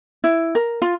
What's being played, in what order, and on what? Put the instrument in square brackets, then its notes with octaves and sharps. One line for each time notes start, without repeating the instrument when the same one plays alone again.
[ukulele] E4
A#4
F4